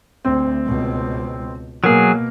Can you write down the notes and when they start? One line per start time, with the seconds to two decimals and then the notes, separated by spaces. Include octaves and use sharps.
0.25 D2 C4
0.65 C#2 B2
1.84 B2 F#3 A#3 G#4 A#4